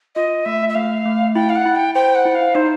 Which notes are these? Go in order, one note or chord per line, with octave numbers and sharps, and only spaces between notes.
F4 D#5
A3 E5
E5
A3 F5
A3
E4 G5
F5
F#5
E4
G5
C5 G5
F#5
E4
F5
D#4 C5